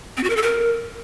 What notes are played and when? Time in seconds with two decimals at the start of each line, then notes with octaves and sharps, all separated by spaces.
0.17 C4
0.24 F#4
0.30 A#4
0.36 A4
0.43 A#4